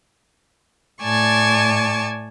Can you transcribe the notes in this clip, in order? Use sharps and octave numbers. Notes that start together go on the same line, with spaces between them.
A2 D5 G#5 A5 C#6